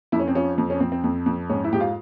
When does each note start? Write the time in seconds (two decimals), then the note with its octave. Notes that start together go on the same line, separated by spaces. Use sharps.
0.12 F2 E4
0.19 C#4
0.28 C4
0.35 F3 C#4
0.58 F2
0.70 C#4
0.80 F2 C4
0.92 C4
1.04 F2
1.26 F2
1.50 G#2 C#4
1.64 E4
1.72 G#2 G4
1.80 F4